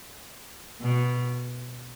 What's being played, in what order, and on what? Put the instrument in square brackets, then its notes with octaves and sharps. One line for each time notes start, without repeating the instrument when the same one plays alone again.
[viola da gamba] B2